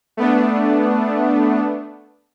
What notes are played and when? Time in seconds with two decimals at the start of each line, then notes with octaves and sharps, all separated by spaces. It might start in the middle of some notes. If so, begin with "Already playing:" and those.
0.17 A3 B3 D4